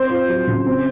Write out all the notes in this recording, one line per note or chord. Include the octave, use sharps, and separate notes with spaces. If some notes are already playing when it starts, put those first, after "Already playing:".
Already playing: C4 C5
F4
F#3
C#3
C4